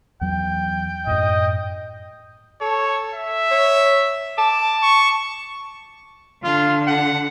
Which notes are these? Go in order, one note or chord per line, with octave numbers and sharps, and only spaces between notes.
E2 F#3 G5
F#2 A2 D#5
A4 C#5
E5
C#5
A5 D6
C#6
D3 F4
F#5